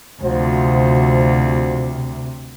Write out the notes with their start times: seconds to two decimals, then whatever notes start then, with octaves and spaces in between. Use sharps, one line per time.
0.23 D2 C3 F3 F#4 C5